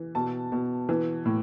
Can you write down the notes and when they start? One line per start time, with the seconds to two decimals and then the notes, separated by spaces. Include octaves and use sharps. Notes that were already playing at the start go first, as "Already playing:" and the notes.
Already playing: E3
0.15 B2 A5
0.52 B2
0.89 E3
1.25 A2